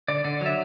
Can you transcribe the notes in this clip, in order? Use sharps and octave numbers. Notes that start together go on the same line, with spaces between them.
D3 D5
D3 D5
F#3 E5